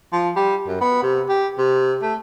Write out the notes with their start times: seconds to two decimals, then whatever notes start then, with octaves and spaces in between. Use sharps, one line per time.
0.13 F3
0.36 G3
0.67 F#2
0.81 B3
1.03 C3
1.29 G4
1.58 C3
2.02 A3